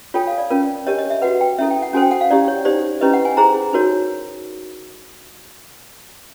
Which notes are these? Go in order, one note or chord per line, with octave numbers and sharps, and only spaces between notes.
D4 F4 A4 C#5 G5
F5
D5
C#4 F4 A#4
D4 G4 A#4 C#5 D#5
D#5
E5
F#4 B4 F#5
G5
C#4 E4 A4 E5
G5
F#5
C#4 F#4 A4 C5 G#5
G5
F#5
F5
C#4 E4 G4 D5
C#5
D#4 G4 C5 D5
C#4 E4 G4 B4 D#5
F#5
G#5
E4 G#4 C5 A#5
D#4 F#4 A#4 C#5